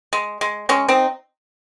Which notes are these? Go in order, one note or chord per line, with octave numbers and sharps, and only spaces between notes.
G#3
G#3
G#3 C#4
C4 D#4